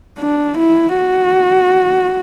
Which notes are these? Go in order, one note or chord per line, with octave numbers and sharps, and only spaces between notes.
D4
E4
F#4